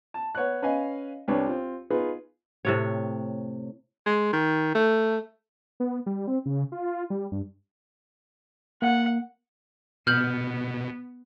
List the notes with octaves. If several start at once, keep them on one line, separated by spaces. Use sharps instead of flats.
A5
B3 C#5 F#5 F#6
C#4 B4 D#5 F5 G#5
C2 D4 B4 C#5
C4 F4
B3 D#4 F4 G#4 B4
A2 C3 C#5
G#3
D#3
A3
B3
G3
C4
C#3
F4
G3
G2
A#3 F#5
B2 B3 F6 G6 F#7